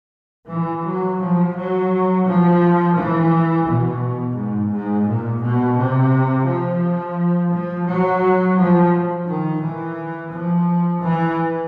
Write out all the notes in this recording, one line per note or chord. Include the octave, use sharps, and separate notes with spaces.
E3
F#3
F3
F#3
F3
E3
B2
G#2
G#2
A#2
B2
C3
F3
F3
F#3
F3
D#3
E3
F3
E3